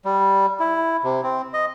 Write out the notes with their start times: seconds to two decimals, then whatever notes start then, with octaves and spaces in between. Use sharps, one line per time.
0.05 G3
0.60 E4
1.04 C3
1.23 C4
1.54 D#5